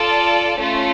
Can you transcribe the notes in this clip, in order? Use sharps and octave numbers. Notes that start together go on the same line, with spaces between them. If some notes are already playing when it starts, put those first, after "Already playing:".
Already playing: F4 A4 D5 A5
A3 C#4 F4